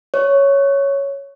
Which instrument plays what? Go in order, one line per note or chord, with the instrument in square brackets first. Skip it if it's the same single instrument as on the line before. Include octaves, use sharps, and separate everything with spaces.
[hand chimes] C#5